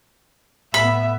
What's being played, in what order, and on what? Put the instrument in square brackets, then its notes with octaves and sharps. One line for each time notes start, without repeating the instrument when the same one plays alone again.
[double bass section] A2 B3 [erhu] E5 [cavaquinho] B5